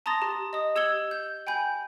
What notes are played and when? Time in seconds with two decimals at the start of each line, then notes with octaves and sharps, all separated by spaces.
0.06 A5 A#5 C6 D#6 A6 A#6
0.22 G4
0.53 D#5 D#6
0.76 G4 E6 G#6 C#7 F#7 G7
1.11 G6
1.47 G5 G#5 B5 G6